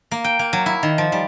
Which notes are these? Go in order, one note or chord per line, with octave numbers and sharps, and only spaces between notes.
A#3
G5
A#3
F#3
E4
D#3
F3
G3